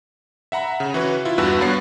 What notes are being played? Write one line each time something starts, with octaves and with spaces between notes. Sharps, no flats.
E5 F#5 A#5 B5
C#3
E3 C#4 E4 F#4 B4
E4 F4
E2 G2 F#4 B4 B5 E6
G2 B3 C#5 F#5 A6 C7